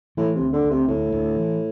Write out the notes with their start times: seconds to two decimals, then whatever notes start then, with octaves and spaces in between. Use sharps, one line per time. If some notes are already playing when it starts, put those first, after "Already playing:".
0.17 A2 E3
0.35 C3
0.41 D2
0.53 D3
0.65 D2
0.71 C3
0.88 D2 A2
1.12 D2
1.36 E3